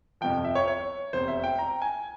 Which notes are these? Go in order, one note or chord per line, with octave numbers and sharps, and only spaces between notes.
G1 F2 C3 F3 G5
E5
C#5
C#5
F1 E2 C3 C5
E5
G5
A#5
G#5